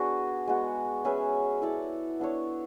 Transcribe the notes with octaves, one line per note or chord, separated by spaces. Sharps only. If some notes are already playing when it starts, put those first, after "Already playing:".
Already playing: B3 D4 F#4 G#4
G#3 B3 F#4
C#4 G#4 B4 E5
E4 A4 D5
B3 D4 A4 C#5